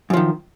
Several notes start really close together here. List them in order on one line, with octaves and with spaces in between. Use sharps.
F#2 F3 D#3